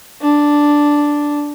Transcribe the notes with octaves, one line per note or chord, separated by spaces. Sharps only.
D4